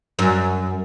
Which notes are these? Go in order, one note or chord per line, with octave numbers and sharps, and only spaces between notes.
F#2